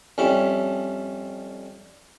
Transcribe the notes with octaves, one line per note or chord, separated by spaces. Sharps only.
F2 G3 C#4 E4 B5